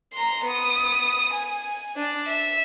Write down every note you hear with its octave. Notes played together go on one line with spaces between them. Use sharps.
A#5 C6
B3 D#6
G#5
D4
E5